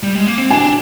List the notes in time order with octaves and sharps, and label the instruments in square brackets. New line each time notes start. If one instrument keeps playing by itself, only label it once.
[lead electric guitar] G3
G#3
A#3
C4
[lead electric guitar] D4 [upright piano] G#5